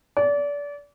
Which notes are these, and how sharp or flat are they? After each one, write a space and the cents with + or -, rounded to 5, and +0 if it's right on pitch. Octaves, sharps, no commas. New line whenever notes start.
D5 -30